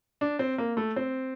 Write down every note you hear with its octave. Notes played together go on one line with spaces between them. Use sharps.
D4
C4
A#3
A3
C4